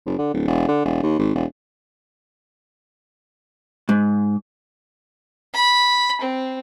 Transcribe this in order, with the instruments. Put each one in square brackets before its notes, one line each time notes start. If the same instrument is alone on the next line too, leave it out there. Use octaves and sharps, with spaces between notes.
[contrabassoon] F#1
D3
D1
E1
D3
E1
D#2
G#1
E1
[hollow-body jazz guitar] G#2
[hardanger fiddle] B5
C4